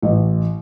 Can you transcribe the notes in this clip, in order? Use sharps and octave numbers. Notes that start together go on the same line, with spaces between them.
A1